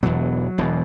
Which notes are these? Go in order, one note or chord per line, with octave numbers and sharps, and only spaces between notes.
E1 E2 B2 F#3
E1 E2 B2